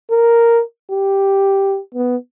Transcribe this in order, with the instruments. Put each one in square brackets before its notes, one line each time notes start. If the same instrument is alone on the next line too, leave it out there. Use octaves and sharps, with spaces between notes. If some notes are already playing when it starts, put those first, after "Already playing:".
[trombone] A#4
G4
B3